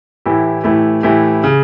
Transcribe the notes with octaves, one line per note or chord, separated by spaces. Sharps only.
A2 E3 A3 E4 G4
A2 E3 A3 E4 G4
A2 E3 A3 E4 G4
C#3